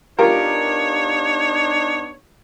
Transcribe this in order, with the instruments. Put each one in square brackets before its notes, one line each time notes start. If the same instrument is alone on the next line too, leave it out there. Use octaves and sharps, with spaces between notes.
[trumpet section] B3 D4 D#4 [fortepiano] F4 G4 A#4 [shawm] C#5